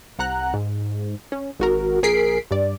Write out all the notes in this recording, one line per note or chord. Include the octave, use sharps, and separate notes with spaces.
C2 F#5 A#5 F#6
G#2
C#4
G#1 F#4 A#4
A#1 G#4 A#4 B6 C7 D7
G2 D5